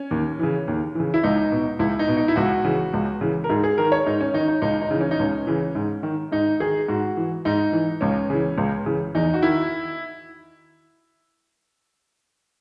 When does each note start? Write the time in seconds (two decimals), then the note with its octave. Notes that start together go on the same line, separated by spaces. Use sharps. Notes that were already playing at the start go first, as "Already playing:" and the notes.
Already playing: C#4
0.11 D#2
0.39 C#3 E3
0.68 D#2
0.95 C#3 E3
1.14 E4
1.23 C#2 D#4
1.52 B2
1.79 C#2 E4
1.99 D#4
2.08 B2
2.17 D#4
2.28 E4
2.36 C#2 F#4
2.65 C#3 E3
2.94 C#2
3.21 C#3 E3
3.44 A#4
3.49 G#2 G#4
3.64 G#4
3.78 D#3 A#4
3.92 C#5
4.07 G#2 D#4
4.21 C#4
4.34 D#3 D#4
4.48 D#4
4.62 C#2 D#4
4.82 D#4
4.91 C#3 E3
5.01 C#4
5.11 D#4
5.19 C#2 C#4
5.47 C#3 E3
5.75 G#2
6.03 D#3
6.32 G#2 D#4
6.60 D#3 G#4
6.88 G#2 F#4
7.17 E3
7.45 G#2 D#4
7.72 E3
8.01 C#2 C#4
8.30 C#3 E3
8.58 C#2
8.86 C#3 E3
9.15 E2 D#4
9.34 F#4
9.43 D#3 E4